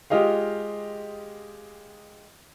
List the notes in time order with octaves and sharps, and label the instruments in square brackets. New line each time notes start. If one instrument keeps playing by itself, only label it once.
[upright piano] G#3 F4 G4 D#5 F5